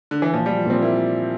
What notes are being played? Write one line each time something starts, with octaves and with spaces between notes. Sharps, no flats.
D3
E3
A#2 F3
F3 G3
A#2 C4
A#3 E4